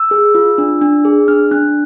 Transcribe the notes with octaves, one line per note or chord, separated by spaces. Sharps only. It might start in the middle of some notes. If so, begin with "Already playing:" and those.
Already playing: E6
G#4
F4
D4
D4
G#4
D4 F6
D4 F#6